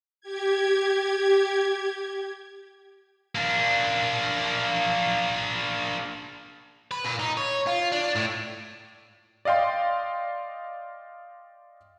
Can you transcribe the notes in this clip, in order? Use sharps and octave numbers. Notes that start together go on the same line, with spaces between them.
G4 G#6
A#3 D4
B4
A#2
D#4
C#5
F4
D4
A2
D5 D#5 F5 G5 C6